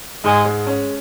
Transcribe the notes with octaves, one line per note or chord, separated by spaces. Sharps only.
G#2 G#3
G#3
C#4